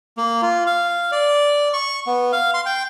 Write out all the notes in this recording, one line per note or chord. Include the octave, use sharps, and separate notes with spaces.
A#3
F4
F5
D5
C#6
B3
F5
C6
G5